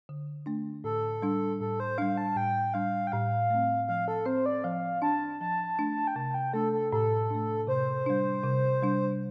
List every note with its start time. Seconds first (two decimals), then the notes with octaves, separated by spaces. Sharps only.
0.09 D3
0.46 A3 D4
0.84 A2 A4
1.22 G3 D4
1.60 A2 A4
1.80 C5
1.98 G3 D4 F5
2.17 A5
2.36 A2 G5
2.74 G3 D4 F5
3.07 G5
3.12 A2 F5
3.50 A3 C4
3.88 F3 F5
4.08 A4
4.26 C4 C5
4.46 D5
4.64 F3 F5
5.02 D4 A5
5.40 F3 A5
5.79 A3 D4
6.07 G5
6.16 C3 A5
6.34 G5
6.53 A3 D4 A4
6.73 A4
6.92 A2 A4
7.30 A3 D4
7.67 C3 C5
8.06 G3 D4
8.43 C3
8.82 G3 D4